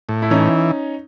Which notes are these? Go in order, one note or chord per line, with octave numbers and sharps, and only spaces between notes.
A2
E4
E3 C#4 D#4